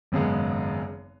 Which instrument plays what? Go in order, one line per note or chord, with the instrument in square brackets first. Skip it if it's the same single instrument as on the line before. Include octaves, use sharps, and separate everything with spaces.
[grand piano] G#1 F#2 C#3 G#3 B3